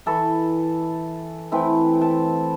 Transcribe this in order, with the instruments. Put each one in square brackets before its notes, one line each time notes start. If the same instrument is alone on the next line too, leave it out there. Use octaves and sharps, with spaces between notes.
[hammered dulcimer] E3 A4 B5 C#6
E3 A3 C4 E4
A5